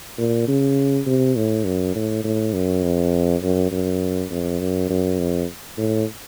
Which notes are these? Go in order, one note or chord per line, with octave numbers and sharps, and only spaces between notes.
A#2
C#3
C3
A2
F#2
A2
A2
F#2
F2
F#2
F#2
F2
F#2
F#2
F2
A2